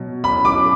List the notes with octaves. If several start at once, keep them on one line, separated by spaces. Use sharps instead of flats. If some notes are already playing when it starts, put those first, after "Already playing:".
Already playing: B2 F#3
B5
D6